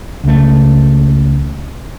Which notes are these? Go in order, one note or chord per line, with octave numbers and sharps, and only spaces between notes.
C#2 A3